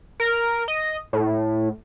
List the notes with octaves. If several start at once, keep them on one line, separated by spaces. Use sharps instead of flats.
A#4
D#5
A2